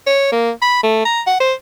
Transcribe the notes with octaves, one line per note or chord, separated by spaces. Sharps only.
C#5
A#3
B5
A3
A#5
F#5
C5